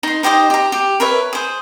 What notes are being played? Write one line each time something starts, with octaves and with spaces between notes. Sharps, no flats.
D#4 C6
D#4 G4 C5 D#5
G4 A#5
G4
A#4 B4 C#5 E5
G#4 C5